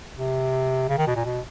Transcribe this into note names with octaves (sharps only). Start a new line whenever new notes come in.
C3
C#3
D#3
B2
A#2
B2